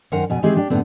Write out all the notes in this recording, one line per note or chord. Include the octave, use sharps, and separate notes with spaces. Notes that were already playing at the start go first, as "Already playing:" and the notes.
F#2 D#3 A#4 C5 F#5 G#5
F2 B2 G#5
D#3 E3 G#3 C4 G4 G#4
D4 G4
F#2 A2 D3 B3 C4